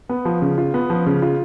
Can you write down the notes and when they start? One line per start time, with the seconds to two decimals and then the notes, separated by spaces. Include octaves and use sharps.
0.09 B3
0.25 F3
0.42 C#3
0.58 F4
0.74 B3
0.90 F3
1.06 C#3
1.22 F4